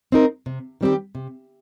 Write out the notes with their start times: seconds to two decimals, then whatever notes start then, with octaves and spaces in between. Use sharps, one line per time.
0.12 C4 D#4 A#4
0.46 C3
0.81 D#3 G3 C4 G4
1.15 C3